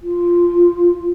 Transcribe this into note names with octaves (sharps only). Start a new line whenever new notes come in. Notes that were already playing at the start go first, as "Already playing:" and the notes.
F4